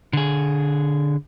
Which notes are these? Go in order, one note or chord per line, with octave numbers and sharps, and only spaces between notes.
D3 G#4